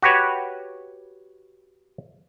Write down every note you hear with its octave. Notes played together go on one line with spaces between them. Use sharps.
F#4 G4 B4 C#5